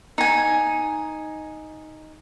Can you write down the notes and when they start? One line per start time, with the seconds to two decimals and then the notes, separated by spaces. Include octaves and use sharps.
0.18 D#4 G#5